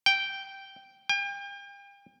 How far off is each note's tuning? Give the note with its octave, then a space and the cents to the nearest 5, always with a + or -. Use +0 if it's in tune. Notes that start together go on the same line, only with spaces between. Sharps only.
G5 -5
G5 +40